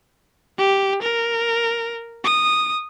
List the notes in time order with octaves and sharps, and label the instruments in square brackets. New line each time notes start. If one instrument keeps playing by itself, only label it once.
[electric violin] G4
A#4
D#6